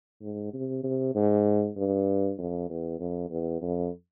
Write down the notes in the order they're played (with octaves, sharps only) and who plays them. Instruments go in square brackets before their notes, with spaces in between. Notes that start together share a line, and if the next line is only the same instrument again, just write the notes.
[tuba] G#2
C3
C3
G#2
G2
F2
E2
F2
E2
F2